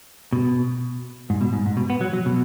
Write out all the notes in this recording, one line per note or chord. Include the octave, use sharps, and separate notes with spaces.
B2
G#2
B2
G#2
G#2
B2
B3
F#3
F#3
B2